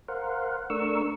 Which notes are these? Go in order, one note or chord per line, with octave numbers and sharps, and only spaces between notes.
A#4 C5 F5 F#5
A3 D4 A#4 C#6 E6